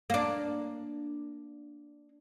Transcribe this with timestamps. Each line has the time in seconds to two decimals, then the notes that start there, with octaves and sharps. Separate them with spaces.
0.10 A#3 D4